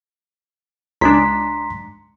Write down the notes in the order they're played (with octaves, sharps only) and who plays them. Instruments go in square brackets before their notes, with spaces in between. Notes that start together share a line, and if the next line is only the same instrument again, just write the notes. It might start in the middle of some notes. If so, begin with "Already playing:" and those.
[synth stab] C#2 G#3 D4 [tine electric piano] A#5 C6 B6